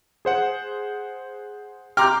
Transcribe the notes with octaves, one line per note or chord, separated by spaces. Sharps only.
G#4 C5 F#5
G5 A#5 C6 D6 F6 G6